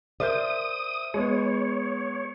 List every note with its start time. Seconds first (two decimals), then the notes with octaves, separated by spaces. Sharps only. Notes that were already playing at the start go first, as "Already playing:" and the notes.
0.20 A#4 C5 D5 E5 D#6 G6
1.14 G#3 B3 C#5